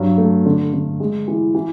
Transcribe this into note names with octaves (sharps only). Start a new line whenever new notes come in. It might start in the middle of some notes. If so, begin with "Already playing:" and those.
Already playing: G2 F#3
A3
D3
D3
G#3
E3
E3